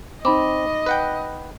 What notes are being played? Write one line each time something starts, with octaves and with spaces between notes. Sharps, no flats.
C4 D#4 D#5 B5 D6
B4 F#5 G5